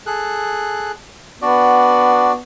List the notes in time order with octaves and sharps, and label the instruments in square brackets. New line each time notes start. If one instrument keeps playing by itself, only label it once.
[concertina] G#4 A4 F#6
[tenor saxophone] B3 [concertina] D4 F#4 D5